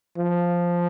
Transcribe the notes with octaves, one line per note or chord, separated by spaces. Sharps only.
F3